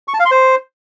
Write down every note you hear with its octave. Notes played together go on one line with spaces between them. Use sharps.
C#6
A5
F5
C6
C5